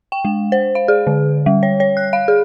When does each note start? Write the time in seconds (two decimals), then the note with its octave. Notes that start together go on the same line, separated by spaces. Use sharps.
0.12 G5
0.25 G#3
0.52 C5
0.75 F5
0.88 G#4
1.07 D3
1.46 G3
1.63 C#5
1.80 C#5
1.97 F#6
2.13 F5
2.28 G#4